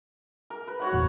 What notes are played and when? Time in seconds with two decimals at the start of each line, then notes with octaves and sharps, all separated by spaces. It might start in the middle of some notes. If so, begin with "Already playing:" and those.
0.50 A#4
0.67 B4
0.80 F#4 C#5 F#5
0.92 F#1 E2 A#2